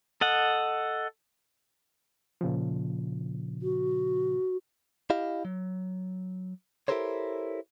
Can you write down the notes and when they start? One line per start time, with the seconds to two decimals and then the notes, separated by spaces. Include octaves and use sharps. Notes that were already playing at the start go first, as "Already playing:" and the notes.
0.21 A4 D#5 F#5
2.41 A#2 C#3 F3
3.62 F#4
5.10 E4 G4 D#5 F5
5.45 F#3
6.88 E4 G4 A4 A#4 C5 C#5